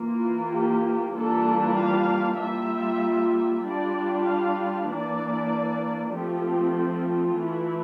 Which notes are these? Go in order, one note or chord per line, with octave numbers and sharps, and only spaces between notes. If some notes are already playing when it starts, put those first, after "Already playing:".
Already playing: E3 A#3 F4
G4
E3 G3 A#3 D4 F4 A4
F5
G3 A#3 F4 E5
G3 D4 F4 D5
F5
E3 A#3 D4 D5
F3 A3 C4 F4 G4
F4
E3 A3 E4